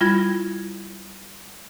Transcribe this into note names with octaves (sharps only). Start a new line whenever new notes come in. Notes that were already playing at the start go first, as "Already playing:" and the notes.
G3 E4 F4 B5 G#6 A#6